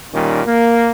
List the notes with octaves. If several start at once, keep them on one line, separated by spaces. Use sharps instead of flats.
A#2 D#3 G3 C#4
A#3